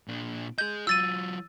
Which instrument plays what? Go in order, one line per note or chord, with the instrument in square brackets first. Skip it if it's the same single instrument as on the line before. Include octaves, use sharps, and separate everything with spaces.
[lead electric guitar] A#2 D4
[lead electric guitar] G#4 D#5 [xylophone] G6
[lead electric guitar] F#3 F4 [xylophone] E6 A6 D#7